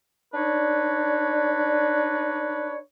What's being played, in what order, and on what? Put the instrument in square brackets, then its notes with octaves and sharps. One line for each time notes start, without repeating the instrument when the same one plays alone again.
[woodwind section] D4 D#4 B4 C#5 D5